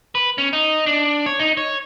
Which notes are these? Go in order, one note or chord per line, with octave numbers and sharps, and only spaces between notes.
B4
C#4
D#4
D4
C#5
D#4
C#5